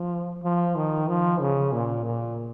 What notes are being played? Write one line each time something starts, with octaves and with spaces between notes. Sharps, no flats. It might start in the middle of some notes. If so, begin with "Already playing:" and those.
Already playing: F3
F3
D#3
F3
C#3
A#2
A#2